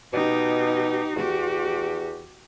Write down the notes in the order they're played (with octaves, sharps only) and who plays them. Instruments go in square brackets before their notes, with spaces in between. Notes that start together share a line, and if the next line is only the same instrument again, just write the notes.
[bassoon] B2 [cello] D#4 G4
[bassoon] E2 [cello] F#4 G4